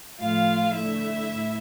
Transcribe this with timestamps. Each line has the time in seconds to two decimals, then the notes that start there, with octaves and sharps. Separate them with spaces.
0.19 A2 F3 A3 F4 F5
0.75 D3 A3 E4 E5
1.30 A2